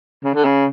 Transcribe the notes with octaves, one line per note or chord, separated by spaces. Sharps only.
C#3
D3
C#3